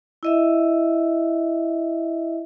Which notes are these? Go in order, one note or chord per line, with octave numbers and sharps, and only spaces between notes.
E4 D#5 E5